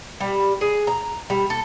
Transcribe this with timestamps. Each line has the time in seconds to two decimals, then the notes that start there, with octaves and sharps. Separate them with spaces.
0.20 G3
0.61 G#4
0.87 A#5
1.30 G3
1.50 A4